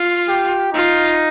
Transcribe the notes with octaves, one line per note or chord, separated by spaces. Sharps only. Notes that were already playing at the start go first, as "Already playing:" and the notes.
Already playing: F4
G4
D#4 F4